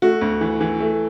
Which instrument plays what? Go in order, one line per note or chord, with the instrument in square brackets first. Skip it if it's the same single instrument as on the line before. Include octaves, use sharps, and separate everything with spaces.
[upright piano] A3 F#4
D2
E3
E3
A3